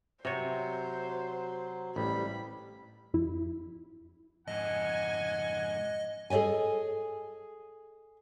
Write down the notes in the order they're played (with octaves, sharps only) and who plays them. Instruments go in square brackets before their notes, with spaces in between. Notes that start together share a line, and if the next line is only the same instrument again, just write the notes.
[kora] C3 C#5 [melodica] F#3 [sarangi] C5
[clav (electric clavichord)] A1 [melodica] G3 [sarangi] B5
[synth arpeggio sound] F2 E4
[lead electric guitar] F2 G#2 [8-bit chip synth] D#5 [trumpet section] F#5 G#5
[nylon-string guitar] G#4 A4 C#5 D#5 G#5